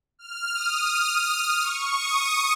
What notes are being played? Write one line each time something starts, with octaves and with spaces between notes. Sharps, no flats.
F6
D#6
C#6
D#6